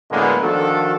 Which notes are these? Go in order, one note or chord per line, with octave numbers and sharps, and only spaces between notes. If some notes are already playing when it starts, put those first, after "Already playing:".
A2 D3 F#3 G#3 A#3 B3
D#3 F3 D4 F#4 A4